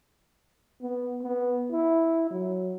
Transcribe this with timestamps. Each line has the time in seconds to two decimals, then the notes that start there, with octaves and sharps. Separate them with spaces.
0.82 B3
1.23 B3
1.72 E4
2.31 F#3